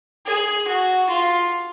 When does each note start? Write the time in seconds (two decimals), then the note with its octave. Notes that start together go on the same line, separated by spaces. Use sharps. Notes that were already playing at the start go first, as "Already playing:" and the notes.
0.26 G#4
0.67 F#4
1.09 F4